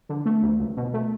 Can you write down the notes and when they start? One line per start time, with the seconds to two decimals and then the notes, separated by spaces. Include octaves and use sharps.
0.09 D3
0.26 A3
0.42 D2
0.60 C#2
0.77 B2
0.94 A3